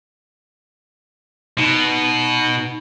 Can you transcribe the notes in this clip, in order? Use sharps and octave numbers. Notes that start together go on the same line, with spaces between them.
B2 D#4